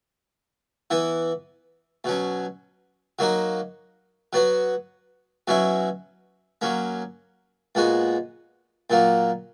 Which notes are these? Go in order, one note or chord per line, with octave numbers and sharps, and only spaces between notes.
E3 B3 E4
B2 F#3 C#4
F#3 A#3 D#4 F#4
F#3 B3 F#4
B2 F#3 C#4 E4
F#3 A#3 C#4
A#2 G#3 B3 F#4
A#2 F#3 A#3